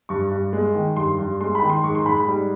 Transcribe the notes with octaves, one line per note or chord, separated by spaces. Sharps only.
G2 C#6
G2
G#3
D#3
G2 C6
G2
G#3 C6
B5
D#3
C6
G#2 C#6
C6
G#2 B5
B5
G3